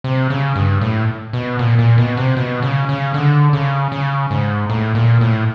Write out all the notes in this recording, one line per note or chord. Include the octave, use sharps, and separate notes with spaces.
C3
C#3
G2
A2
B2
A#2
A#2
B2
C3
B2
C#3
C#3
D3
C#3
C#3
G#2
A2
A#2
A2